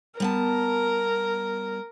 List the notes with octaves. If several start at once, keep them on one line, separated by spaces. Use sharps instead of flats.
G3 B3 A#4 A5